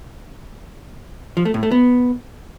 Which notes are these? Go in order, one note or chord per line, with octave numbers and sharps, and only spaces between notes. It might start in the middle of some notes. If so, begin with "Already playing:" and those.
F3
A3
A2
A3
B3